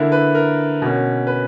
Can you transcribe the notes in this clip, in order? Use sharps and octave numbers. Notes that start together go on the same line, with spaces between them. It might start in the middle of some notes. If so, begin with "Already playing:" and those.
Already playing: D3 A#3 E4
B4
A#4
B2 A#3 C#4
B4